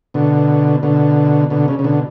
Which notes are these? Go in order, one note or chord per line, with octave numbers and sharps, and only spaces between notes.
B2 D3
B2 D3
B2 D3
C#3
C#3
B2 D3